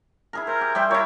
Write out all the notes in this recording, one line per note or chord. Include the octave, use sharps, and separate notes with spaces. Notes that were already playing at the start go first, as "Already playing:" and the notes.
E4 G#4 A#4
A#4 C5
G4
G3 C5 E5 G5
E4 F4 A#4 C#5